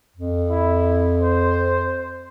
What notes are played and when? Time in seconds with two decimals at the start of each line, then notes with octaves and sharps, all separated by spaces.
0.16 F2
0.49 E4
1.22 C5